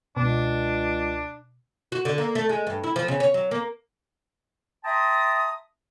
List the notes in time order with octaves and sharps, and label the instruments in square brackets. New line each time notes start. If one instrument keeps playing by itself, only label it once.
[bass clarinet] C#2 [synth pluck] B2 [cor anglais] D4
[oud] F#4
D3
A#3
A3
G#3
G2
E4
F3
C#3
C#5
F#3
A#3
[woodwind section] E5 G5 A5 A#5 C6 D#6